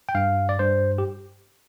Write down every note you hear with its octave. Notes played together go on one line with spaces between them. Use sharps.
G5
G2 F5
D5
G2 C5
G4